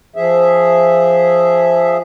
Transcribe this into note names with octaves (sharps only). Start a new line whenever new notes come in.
F3 G#4 E5